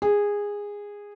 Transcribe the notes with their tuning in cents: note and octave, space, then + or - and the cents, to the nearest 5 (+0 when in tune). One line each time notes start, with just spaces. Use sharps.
G#4 -15